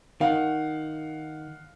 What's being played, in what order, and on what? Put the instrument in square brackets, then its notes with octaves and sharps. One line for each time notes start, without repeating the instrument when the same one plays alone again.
[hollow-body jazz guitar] D#3 [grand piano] F5 F#5